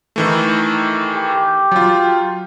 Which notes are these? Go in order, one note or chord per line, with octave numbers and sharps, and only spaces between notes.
D#3 E3 A3
G4
F#3 F4